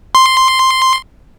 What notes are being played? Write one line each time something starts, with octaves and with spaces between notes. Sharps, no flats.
C6